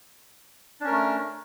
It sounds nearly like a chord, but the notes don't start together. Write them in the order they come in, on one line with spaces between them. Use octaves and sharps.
D4 C#4 A#4 A3